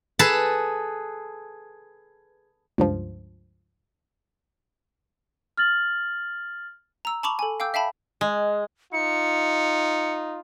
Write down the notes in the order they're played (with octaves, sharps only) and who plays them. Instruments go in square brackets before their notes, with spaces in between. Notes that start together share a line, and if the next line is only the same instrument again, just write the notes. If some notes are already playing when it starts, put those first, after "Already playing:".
[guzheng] G#4 A4 B4 A5
[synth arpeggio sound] C#2 G2 F3
[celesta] F6 A6 F#7
[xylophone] A#5 E6
A5 B5 C#6 D6 F7 F#7
A4 G#5
F5 G5 D6 E6 G6
E5 F5 G5 A5 B5
[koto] G#3
[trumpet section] D#4 F4 [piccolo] C#7